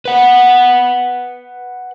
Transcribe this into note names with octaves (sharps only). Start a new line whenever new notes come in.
B4 F#5